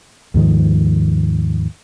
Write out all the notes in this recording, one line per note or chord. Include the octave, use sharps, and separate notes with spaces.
D#2 G#2 D#3 F3